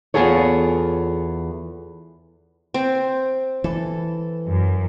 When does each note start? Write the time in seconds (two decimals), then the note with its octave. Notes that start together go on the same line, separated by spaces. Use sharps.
0.14 E2 C#3 F4 G#4 A4 C#5
2.74 C4
3.64 E3 A4
4.47 F#2